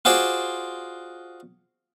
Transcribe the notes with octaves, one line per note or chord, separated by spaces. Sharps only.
F4 F#4 G#4 C5 D5